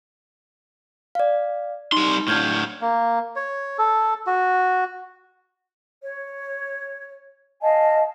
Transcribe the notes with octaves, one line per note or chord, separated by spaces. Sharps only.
D5 F5
G3 D#4 C6
A2 D4 F6 G6 G#6
A#3
C#5
A4
F#4
C#5
D#5 F5 G#5 A5